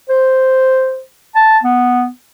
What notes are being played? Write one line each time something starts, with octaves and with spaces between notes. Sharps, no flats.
C5
A5
B3